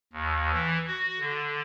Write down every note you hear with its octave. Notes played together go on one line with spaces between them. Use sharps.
D#2
E3
F#4
D3